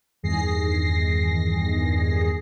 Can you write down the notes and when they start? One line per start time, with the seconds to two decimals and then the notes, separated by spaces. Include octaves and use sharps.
0.23 E2 G2 D#3 G#4 A#6 C7